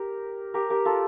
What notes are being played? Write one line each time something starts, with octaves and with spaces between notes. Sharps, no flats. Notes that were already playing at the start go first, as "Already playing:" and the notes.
Already playing: G4 A#4
G4 A#4
G4 A#4
F4 A4